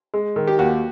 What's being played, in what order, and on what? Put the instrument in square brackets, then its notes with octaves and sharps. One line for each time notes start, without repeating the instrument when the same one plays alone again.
[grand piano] G#3
D#3
[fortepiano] G4
[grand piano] D#2 [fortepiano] F#4